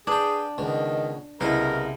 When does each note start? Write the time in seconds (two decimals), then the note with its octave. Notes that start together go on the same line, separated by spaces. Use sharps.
0.07 D4 G#4 B4 G5
0.58 C#2 B2 D#3
1.40 C2 C#3 B3 E4 A#4 B4 D#5